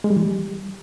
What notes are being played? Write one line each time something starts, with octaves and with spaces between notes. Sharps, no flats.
G#3
G3
E3
G3